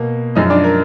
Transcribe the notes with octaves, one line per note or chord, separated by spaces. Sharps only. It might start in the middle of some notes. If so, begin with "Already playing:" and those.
Already playing: B2 A#3
F#2 F3 G#3 D#4 D#5
D4 D5
A#4